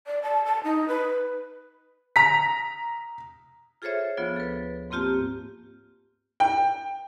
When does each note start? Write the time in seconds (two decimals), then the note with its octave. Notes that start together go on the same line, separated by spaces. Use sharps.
0.07 D5
0.23 A5
0.45 A5
0.64 D#4
0.88 B4
2.16 A#5 B6
3.82 F4 G#4 A4 C5 C#5 E5
4.18 D2 F3 B3 F4
4.36 A4 B4
4.90 G#2 A#3 C4 F4 G4 A5
6.40 G5